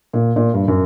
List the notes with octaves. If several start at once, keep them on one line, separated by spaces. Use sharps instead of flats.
A#2
A#2
G2
F#2